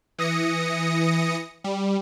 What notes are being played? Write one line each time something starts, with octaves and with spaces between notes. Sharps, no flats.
E3 D#6 A#6 C#7
G3